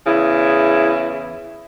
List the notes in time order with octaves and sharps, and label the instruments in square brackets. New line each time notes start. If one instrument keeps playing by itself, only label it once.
[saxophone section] E2 C#3 E4